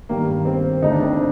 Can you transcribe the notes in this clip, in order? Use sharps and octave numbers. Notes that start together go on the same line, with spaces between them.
G2 D#3 G3 A#3
C4
D2 D3 A3 D#4
D4
C4
D4